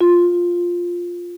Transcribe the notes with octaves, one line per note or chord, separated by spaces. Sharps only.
F4